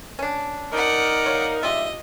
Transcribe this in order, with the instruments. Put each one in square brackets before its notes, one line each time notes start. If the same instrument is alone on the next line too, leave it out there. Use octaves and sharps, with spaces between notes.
[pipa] C#4 D4
[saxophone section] D#4 A#4 [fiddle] D5 F#5
[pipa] C#5 F5
[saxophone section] G#2 D4 E5 [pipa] F4 G4 [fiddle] D#5